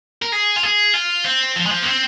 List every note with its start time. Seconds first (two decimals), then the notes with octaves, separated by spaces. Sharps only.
0.22 A#4
0.33 G#4
0.57 F4
0.63 G#4
0.94 F4
1.25 C4
1.56 F3
1.66 G#3
1.71 F3
1.82 A#3
1.86 C4